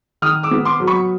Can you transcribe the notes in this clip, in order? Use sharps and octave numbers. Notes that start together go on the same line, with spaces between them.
D#3 D#6 F6
D6 E6
B3
C6 D6
F#3
B5 C#6